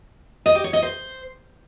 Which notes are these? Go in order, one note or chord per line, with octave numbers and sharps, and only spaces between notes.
D#5
G4
C#5
D#5
C5